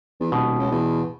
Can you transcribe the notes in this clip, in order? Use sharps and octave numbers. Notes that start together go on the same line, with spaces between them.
E2
D#1 B2
C#2
E2